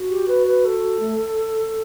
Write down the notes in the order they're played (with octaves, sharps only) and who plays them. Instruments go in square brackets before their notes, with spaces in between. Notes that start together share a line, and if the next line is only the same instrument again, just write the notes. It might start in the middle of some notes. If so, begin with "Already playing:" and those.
Already playing: [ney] F#4
[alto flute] G4
B4
B4
A4
[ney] A3